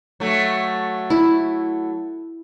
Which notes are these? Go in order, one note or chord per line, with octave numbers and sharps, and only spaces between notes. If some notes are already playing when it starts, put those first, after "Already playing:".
F#3 A3
E4